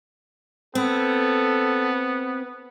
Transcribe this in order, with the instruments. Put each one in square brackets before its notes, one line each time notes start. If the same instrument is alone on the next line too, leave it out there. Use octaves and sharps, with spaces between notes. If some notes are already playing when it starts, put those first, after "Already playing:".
[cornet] B3 [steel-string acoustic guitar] C4 [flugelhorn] A4